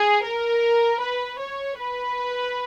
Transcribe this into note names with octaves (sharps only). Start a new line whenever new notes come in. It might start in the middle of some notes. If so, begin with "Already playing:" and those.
Already playing: G#4
A#4
B4
C#5
B4